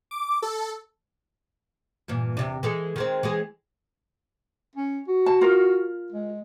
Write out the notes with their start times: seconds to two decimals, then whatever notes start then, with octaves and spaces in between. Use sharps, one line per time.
0.11 D6
0.42 A4
2.08 G2 A#2 E3
2.37 E2 C3 D4
2.63 E3 G#3 A4
2.96 D#3 G#3 C4
3.23 E3 G#3 G#4
4.76 C#4
5.08 F#4
5.26 A5
5.41 F4 A#4
6.12 G#3